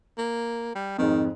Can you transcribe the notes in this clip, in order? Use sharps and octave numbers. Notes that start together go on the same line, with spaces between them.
A#3
G3
F2 G#2 D#3